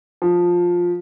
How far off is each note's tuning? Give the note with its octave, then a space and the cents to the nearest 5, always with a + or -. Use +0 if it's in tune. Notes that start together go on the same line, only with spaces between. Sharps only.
F3 +10